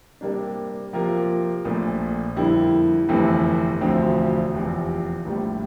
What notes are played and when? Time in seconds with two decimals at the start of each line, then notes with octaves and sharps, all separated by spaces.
0.21 C3 G3 A#3 D4
0.93 C3 F3 A#3 F4 A#4
1.65 A#1 A#2 F3 A3
2.36 F2 D3 G3 A#3 E4
3.09 G1 F2 C3 E3 A3
3.81 E1 D2 D3 F3 C4
4.53 F1 E2 C3 F3
5.25 A#1 A2 G3